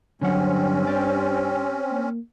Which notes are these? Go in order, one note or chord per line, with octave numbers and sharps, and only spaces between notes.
G2 D3 F#3 C4 C#4 F#5
G4 D5
A#3